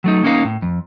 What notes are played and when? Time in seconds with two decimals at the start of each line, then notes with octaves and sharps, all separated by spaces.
0.04 F#3 A3 D#4
0.24 A#3 C#4 D#4 A#4 F5
0.45 A2
0.62 F2